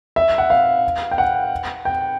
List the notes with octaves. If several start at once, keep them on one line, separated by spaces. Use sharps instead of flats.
E5
F#5
F5
G5
F#5
G5